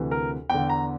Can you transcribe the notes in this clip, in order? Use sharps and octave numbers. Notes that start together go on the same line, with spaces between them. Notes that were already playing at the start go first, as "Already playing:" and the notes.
Already playing: D2 C3 E3
A#4
E2 D3 G5
A#5